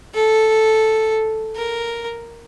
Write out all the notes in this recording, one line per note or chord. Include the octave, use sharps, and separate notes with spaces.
A4
A#4